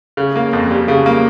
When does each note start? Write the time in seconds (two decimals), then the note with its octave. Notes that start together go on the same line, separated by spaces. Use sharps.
0.17 C#3
0.36 A#3
0.53 F2
0.71 G3
0.88 C#3
1.06 A#3